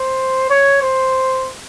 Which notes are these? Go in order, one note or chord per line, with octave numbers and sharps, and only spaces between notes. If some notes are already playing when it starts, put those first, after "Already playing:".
Already playing: C5
C#5
C5